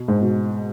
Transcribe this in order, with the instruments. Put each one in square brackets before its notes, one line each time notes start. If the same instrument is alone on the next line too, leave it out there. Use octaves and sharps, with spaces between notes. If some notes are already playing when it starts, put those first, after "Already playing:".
Already playing: [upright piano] B2
G#2
B2